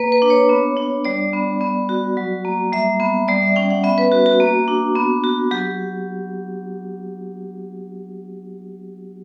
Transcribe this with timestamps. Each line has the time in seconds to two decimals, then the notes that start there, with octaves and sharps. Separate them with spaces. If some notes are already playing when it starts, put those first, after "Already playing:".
Already playing: A#3 B4
0.12 B4
0.22 D4
0.30 C#5
0.49 B3
0.77 D4
1.05 G3 D5
1.33 B3
1.61 B3
1.89 F#4
2.17 F#3
2.45 A#3
2.72 G3 E5
3.00 B3
3.28 G3 D5
3.42 E5
3.56 C#4 G5
3.71 F#5
3.84 B3 E5
3.98 B4
4.12 F#4
4.26 F#4
4.40 A#3
4.68 D4
4.96 B3
5.24 F#4
5.51 F#3 G4